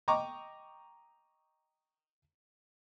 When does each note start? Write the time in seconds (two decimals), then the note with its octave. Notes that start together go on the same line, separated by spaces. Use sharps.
0.08 D#5 G5 A#5 C#6 D6